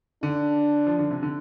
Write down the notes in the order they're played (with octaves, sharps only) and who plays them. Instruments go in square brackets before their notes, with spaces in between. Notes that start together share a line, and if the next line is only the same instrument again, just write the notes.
[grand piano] D3 [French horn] D4
[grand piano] F3
D3
C3
D3